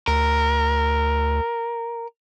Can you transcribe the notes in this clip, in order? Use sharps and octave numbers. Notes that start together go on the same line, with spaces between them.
D2 A#4